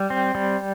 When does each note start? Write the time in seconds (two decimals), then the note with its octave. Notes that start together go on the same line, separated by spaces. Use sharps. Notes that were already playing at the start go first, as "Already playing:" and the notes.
Already playing: G3
0.10 C4
0.35 G3